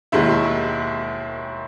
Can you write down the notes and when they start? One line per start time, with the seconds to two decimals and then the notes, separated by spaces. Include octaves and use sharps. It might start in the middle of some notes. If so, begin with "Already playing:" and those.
0.12 E1 D#2 D#3 G#3 E4